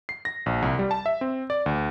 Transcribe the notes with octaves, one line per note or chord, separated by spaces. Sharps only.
C7
A#6
A#1
C2
G3
A5
E5
C4
D5
D2